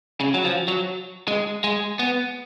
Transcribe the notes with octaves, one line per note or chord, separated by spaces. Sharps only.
C#3
F#3
F3
F#3
G#3
G#3
B3